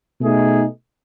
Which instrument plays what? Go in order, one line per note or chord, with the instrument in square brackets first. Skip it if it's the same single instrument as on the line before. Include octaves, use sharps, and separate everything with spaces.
[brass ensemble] B2 A3 D#4 G#4